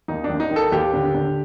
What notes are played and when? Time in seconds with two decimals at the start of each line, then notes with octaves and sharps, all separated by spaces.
0.08 D#2 D#4
0.24 D4
0.30 D#2
0.40 D#4
0.51 D#3
0.56 A4
0.72 D#2 G4
0.93 D3
1.14 D3